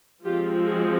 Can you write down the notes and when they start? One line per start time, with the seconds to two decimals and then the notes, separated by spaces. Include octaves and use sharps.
0.24 F3 G#3 C4 F4 G4
0.65 F#4 G#4